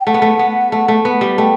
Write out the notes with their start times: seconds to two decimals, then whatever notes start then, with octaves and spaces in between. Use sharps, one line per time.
0.01 G5
0.07 A3 F#5
0.14 B3
0.22 A3
0.39 B3
0.72 A3
0.88 A3
1.05 B3
1.21 G3
1.38 A3 G5